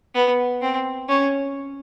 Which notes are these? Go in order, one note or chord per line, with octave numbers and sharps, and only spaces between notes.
B3
C4
C#4